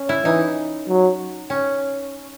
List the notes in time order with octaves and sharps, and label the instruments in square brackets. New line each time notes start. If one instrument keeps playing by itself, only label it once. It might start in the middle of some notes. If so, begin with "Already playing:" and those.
Already playing: [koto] C#4
E4
[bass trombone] E3 [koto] D#4
[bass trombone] F#3
[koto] C#4